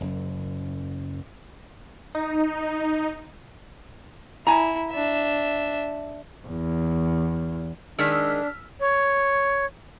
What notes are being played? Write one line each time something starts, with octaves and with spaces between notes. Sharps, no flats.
F#1 F#2
D#4
E4 G#5 A#5
D4 E5
E2
D#3 G#3 D4 E6 F6 B6
C#5